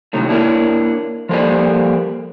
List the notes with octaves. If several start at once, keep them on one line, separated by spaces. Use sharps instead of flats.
A2 C3 D#3 F#3 A3
A#3 D4 E4 A#4 C#5
F3 G3 A#3 A4 C5 D5